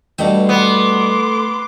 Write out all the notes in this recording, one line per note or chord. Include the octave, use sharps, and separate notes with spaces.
G2 B2 A3 G5
B3 C6 D6